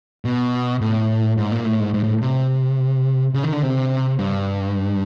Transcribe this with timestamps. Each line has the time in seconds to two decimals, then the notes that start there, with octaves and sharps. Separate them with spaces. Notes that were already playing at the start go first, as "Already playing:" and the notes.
0.25 B2
0.81 A2
1.37 G#2
1.52 A#2
1.65 A2
1.80 G#2
1.94 G#2
2.04 A2
2.22 C3
3.34 C#3
3.44 D#3
3.53 D3
3.63 C3
4.19 G2